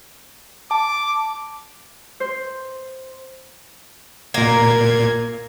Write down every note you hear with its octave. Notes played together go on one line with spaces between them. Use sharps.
A5 D6
C5
A#2 A#3 G#6